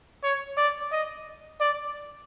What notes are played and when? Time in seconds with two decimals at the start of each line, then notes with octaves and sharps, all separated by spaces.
0.24 C#5
0.58 D5
0.92 D#5
1.61 D5